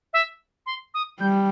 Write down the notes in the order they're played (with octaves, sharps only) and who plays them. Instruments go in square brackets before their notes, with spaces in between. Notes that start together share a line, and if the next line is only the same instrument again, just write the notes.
[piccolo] E5
C6
D#6
[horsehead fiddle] G3 [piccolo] G6